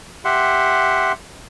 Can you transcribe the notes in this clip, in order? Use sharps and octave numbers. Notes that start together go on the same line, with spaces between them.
G4 E5 F#5 C6